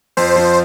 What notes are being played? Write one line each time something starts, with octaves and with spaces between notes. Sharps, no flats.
F2 C5
F3